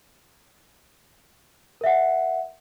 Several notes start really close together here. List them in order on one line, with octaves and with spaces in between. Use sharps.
A#4 E5 F#5